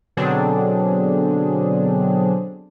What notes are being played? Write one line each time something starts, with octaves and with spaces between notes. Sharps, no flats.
B2 D3 F#3 C4 D4 G#4